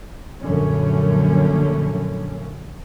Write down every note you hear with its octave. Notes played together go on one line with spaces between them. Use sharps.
A#1 F#2 D3 A3 C#4